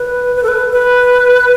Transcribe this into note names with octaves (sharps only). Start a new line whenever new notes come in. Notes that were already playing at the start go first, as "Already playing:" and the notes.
Already playing: B4
B4
A4
B4
B4